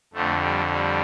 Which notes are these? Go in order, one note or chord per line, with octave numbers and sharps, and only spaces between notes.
F2 D3 A3
G3
G3